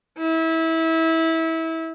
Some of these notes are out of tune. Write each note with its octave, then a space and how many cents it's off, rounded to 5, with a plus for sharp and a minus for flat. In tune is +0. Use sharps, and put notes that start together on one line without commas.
E4 -25